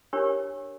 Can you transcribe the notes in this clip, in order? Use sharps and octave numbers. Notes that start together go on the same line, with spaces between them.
D4 G4 A#4 C#5